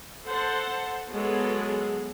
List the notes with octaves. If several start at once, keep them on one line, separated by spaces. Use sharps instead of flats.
A4 C5 F#5 A5
F#3 G#3 B3 G#4 A4